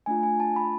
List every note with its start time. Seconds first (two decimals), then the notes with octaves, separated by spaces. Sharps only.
0.06 A3 D4 F4 G#5
0.23 G#5
0.40 A5
0.56 B5